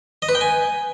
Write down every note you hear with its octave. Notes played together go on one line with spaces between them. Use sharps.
D#5
B4
G5
G#5